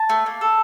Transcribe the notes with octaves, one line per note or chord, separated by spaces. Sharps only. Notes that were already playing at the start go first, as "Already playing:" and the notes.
Already playing: A5
A3
A#3
A4